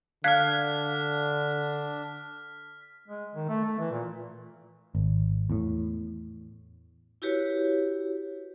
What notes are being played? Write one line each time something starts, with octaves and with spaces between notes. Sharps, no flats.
D3 D4 F5 F6 F#6 G#6 B6
G#3
D#3
A3
A3
E3
A#2
G#1
E2 A2
E4 F#4 G4 B4 C#5